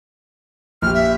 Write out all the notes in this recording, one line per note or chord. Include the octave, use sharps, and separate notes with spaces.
A#1 G4 F6
E5